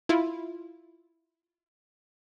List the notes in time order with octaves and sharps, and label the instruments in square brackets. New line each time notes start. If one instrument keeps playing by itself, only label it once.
[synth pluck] E4 F4